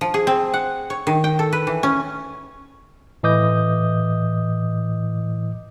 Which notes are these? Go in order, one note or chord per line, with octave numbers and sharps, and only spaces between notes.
F3
G#4
C4
F#5
C#5
D#3
G5
A4
B4
E3
C#4
A2 E3 D#5 D6 D#6 G6